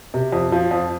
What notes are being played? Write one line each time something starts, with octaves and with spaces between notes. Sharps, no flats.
C3
F2
F3
F2